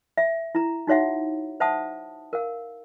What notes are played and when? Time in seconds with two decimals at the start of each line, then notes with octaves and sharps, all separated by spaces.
0.17 E5
0.55 E4 A#5
0.87 D#4 F#4 C#5 E5 F#5
1.60 C5 E5 F#5 A5 D#6
2.33 A#4 F5